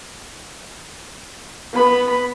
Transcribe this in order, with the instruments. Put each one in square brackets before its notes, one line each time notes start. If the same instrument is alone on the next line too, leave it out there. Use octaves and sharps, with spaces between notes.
[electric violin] B3 B5